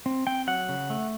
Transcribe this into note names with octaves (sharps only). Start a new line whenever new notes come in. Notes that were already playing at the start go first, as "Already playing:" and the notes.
C4
C4 G5
F#3 F#5
C#3
A3